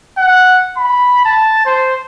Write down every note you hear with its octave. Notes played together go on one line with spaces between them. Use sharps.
F#5
B5
A5
C5